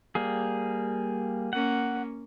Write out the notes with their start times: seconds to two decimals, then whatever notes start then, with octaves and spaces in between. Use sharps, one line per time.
0.15 G3 A#3 G#4
1.53 A#3 C#4 F#5